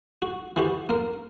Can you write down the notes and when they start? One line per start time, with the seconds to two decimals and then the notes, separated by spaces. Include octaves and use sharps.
0.22 F#4
0.56 E3 F#4 G4
0.89 A#3 A#4